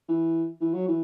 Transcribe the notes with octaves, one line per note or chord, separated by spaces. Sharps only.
E3
E3
F#3
E3